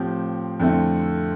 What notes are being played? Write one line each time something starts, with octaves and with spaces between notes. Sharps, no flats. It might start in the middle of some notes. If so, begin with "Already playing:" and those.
Already playing: A2 F3 C4 G4
F2 D3 A3 C4 E4